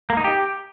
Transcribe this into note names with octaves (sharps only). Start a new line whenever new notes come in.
A#3
D#4
G4